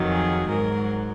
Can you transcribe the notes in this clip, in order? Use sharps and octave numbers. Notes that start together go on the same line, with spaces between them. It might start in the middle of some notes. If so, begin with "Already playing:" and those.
Already playing: F2 D#3 F#3
G#4
G#2 F#3 A#4